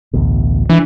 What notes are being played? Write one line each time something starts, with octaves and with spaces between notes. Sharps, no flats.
A1 D2 B2
E3 D4